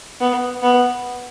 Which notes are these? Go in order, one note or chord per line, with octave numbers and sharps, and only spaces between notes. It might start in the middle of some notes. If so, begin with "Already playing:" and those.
B3
B3